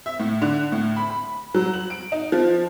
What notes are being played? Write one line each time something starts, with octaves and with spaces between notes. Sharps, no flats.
E5
A2
D3
A2
B5
B5
F#3
F#7
D7
D#4
F3